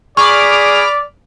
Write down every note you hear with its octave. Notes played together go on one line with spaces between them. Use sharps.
G#4 D5 B5 C#6 D6 F6